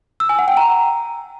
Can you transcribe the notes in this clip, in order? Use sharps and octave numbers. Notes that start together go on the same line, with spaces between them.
E6
G#5
F#5
G5
A#5